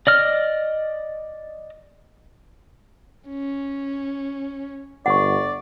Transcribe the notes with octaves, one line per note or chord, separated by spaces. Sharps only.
D5 D#5 F6
C#4
G1 D5 F#5 C#6